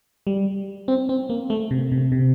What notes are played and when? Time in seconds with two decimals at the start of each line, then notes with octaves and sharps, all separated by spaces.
0.27 G3
0.88 C4
1.09 C4
1.30 A#3
1.50 A3
1.71 C3
1.92 C3
2.12 C3